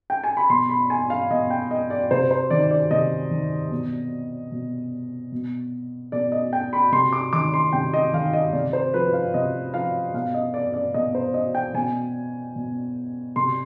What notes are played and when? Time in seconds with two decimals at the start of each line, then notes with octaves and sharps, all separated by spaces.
0.10 G5
0.24 G#5
0.37 B5
0.50 B2 C6
0.69 B5
0.90 G#5
1.10 F5
1.30 B2 D#5
1.50 G5
1.71 D#5
1.90 D5
2.11 C3 C5
2.31 C5
2.51 D#3 D5
2.71 D5
2.91 C3 D#5
3.31 D#3
3.71 B2
4.52 B2
5.32 B2
6.12 B2 D5
6.32 D#5
6.53 G5
6.73 B5
6.92 C3 C6
7.13 D6
7.33 D#3 D6
7.54 C6
7.73 C3 G5
7.94 D#5
8.13 D#3 F5
8.33 D#5
8.53 C3 D5
8.73 C5
8.94 F3 B4
9.13 F5
9.34 C3 D#5
9.74 F3 F5
10.14 B2 F5
10.34 D#5
10.54 D5
10.74 D5
10.94 B2 D#5
11.15 C5
11.34 D#5
11.55 G5
11.74 B2 G#5
12.56 B2
13.36 C3 C6